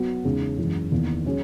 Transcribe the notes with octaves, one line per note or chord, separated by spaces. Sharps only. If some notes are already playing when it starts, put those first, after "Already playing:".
Already playing: F#3 B3 F#4
E2 C#3 G#3 D#4
F#2 E3 G#3
E2 D#3 A#3
F#3 C#4 G#4